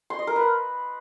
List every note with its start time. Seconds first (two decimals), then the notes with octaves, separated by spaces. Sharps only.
0.10 C6
0.19 D#5
0.27 A#4
0.36 B4